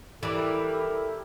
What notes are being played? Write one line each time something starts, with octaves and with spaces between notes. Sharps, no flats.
E3 G3 E4 G4 A4 A#4 D5